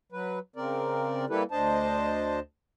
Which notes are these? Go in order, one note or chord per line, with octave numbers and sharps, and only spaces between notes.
F#3 B4
C#3 C4 A#4 D5
G3 A#3 E4 G4 A4 B4
D2 D4 C5 D#5 A5